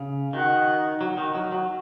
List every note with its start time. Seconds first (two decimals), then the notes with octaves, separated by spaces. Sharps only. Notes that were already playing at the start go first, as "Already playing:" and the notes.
Already playing: C#3
0.33 D#3 D#4 F#4 D#5 F#5
1.01 F#3 F#4 D#5 F#5
1.17 D#3
1.35 F#3
1.52 F#3